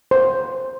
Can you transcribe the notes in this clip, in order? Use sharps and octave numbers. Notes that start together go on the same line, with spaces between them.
C5